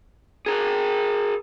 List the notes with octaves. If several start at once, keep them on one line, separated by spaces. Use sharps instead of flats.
G#4 A#4